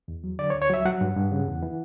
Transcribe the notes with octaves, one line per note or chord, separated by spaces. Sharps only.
E2
F#3
D3 D5
C#5
D2
C#5
F#3 E5
F#3 F#5
G2
G2
C#3
E2
E3